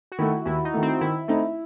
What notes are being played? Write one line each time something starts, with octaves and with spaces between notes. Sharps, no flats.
F#4
D#3 A3 E4
D#2 E4
D#4
D#3 A3
C4
D#3 E4
A3 C4 D#4